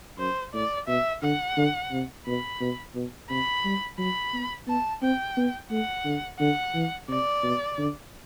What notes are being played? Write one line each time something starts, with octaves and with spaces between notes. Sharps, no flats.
F#2 C5
A2 D5
B2 E5
D3 F#5
D3
C3
B2 B5
B2
B2
C3 B5
G3
F#3 B5
B3
B3 A5
C4 G5
B3
A3 F#5
D3
D3 F#5
E3
C3 D5
B2
D3